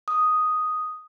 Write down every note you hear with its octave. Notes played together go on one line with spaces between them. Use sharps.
D#6